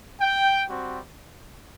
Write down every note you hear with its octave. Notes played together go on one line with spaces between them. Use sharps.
G5
G3 C4 F#4